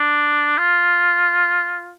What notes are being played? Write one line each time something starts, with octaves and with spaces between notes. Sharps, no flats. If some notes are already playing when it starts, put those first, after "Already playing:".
Already playing: D4
F4